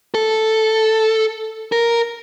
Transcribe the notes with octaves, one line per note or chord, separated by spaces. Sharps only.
A4
A#4